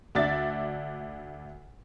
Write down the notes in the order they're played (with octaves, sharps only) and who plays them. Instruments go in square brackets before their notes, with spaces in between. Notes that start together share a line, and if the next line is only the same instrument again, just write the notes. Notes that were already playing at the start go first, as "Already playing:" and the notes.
[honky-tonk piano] D2 D4 E5 A6